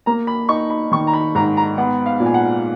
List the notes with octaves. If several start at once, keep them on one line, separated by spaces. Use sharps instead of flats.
A#3 A#5
B5
D#4 C#6
B5
D#3 C#6
A#5
B5
G#2 A#5
A#5
B3 F#5
F5
A#2
G#5
F#5